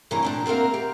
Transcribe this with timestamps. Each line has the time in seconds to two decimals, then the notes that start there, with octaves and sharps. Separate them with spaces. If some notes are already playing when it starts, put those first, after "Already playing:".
0.11 G2 C3 E3 A#3 C#5 A#5
0.23 A#2 D4 G5
0.46 A#3 C4 F#4 A#4 F5
0.74 G4